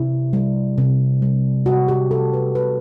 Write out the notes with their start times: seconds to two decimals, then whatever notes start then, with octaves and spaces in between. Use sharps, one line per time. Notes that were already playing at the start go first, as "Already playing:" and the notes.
Already playing: C3 E4
0.33 G3
0.78 C3
1.22 G3
1.66 C3 F#4
1.88 G4
2.11 G3 A4
2.33 B4
2.55 C3 B4